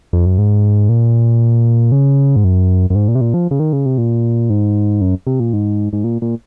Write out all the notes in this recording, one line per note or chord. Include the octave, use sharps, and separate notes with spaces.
F2
F#2
G#2
A#2
C#3
G#2
F#2
F#2
G#2
A#2
C3
A#2
F3
C#3
D#3
C#3
C3
A#2
G#2
F#2
C3
A#2
G#2
G#2
A#2
A#2